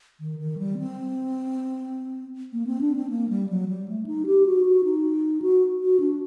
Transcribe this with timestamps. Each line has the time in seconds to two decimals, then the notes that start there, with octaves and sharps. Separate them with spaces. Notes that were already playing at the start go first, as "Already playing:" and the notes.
0.20 D#3
0.39 D#3
0.58 G3
0.78 C4
2.53 A#3
2.67 C4
2.81 D4
2.96 C4
3.10 A#3
3.29 G3
3.49 F#3
3.68 G3
3.88 A3
4.06 D#4
4.26 G4
4.46 F#4
4.65 F#4
4.84 D#4
5.42 F#4
5.81 F#4
6.00 D4